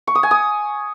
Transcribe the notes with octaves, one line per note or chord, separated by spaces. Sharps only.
C#6
D#6
G#5
D#6